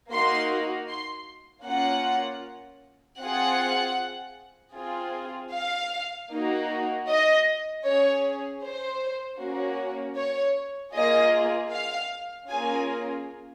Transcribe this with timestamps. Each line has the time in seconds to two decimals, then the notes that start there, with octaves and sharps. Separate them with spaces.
0.11 A#3 D#4 F#4 C6
0.88 C6
1.66 A#3 C#4 F4 F#5
3.21 C4 F4 G#4 F#5
4.76 C4 F4 G#4
5.53 F5
6.30 A#3 D#4 F#4
7.07 D#5
7.85 C#4 G#4 C#5
8.63 C5
9.40 A#3 C#4 F#4
10.18 C#5
10.95 A#3 F4 G#4 D#5
11.73 F5
12.49 A#3 C#4 F4 G#4 G#5